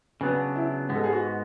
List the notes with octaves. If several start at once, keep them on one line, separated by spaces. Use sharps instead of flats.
C#3 F#3 B3 D4 B4
E4
G#2 G#3 B3
A4
G#4
F#4